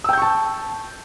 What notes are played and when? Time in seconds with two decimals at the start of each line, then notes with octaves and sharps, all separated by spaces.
0.04 E6
0.09 G5
0.13 G6
0.18 C#6
0.22 A5